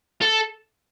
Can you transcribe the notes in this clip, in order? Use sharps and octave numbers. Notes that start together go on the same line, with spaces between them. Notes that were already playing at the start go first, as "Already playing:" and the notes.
A4